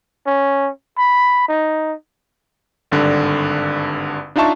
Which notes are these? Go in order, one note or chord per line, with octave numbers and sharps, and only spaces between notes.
C#4
B5
D#4
G#1 G2 D3 D4
D4 D#4 F4 E5 A5 C#6